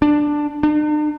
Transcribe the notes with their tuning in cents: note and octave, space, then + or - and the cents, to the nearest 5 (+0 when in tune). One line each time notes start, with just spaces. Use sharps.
D4 +10
D4 +45